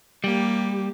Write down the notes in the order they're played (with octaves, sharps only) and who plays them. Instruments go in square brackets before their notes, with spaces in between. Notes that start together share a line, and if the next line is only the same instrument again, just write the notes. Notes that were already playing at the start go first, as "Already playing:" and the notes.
[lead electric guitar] G3 [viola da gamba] A#3 G4